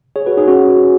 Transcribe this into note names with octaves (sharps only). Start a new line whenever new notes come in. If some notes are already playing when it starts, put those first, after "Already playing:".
G#4 C#5
F#4 B4
D#4 G#4
C#4 F#4